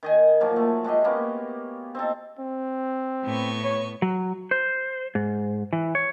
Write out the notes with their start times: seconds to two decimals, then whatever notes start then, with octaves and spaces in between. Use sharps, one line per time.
0.03 D#3 D#5 G#5
0.41 A#2 F3 F#3 A#3
0.56 A3
0.84 G#3 A3 G4 D#5
1.04 A#3 B3 C#4
1.95 C4 D#4 A4
2.39 C4
3.25 A2 B3 C#6
3.63 C#5
4.02 F#3
4.51 C5
5.15 G#2
5.73 E3
5.95 C#5